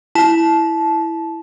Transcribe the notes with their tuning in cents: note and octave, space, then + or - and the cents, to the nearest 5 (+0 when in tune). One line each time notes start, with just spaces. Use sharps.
E4 +0 A5 -20